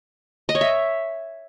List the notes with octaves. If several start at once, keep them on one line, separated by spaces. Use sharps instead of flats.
D#5
C#5
E5